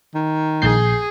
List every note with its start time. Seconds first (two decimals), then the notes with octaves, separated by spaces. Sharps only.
0.15 D#3
0.62 A#1 G#4 G6 C7